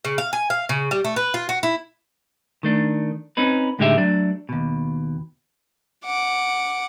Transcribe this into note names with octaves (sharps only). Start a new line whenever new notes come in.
C#3
F5
G#5
F5
C#3
G3
A3
B4
F4
F#4
E4
D#3 A3 D4
C4 C#4 D#4 B4
A2 D3 G#3 D#4 G4 E5
F#3 A3 D4
D#2 B2
F#5 D6